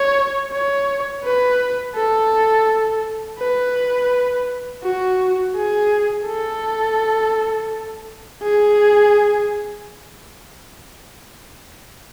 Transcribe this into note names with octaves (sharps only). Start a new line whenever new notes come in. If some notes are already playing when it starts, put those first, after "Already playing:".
Already playing: C#5
C#5
B4
A4
B4
F#4
G#4
A4
G#4